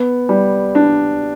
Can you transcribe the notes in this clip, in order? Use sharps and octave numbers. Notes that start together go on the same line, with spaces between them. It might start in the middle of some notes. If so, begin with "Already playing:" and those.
Already playing: B3
G3
D4